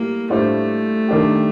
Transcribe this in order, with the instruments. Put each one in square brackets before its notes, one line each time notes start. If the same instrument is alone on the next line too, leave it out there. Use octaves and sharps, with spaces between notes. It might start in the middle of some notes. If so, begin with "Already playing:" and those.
Already playing: [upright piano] A2 G3 [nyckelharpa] A#3
[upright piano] A2 G3 D4 F4 C5 [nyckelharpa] A3
[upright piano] D#3 G3 D4 G4